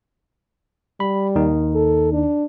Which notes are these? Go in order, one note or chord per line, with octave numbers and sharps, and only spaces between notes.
G3 B5
D#2 D#3 D#4
A4
D4